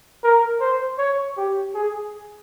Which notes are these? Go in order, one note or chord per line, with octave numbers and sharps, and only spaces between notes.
A#4
C5
C#5
G4
G#4